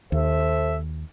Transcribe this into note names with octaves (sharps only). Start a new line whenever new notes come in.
D#2 A4 C5 E5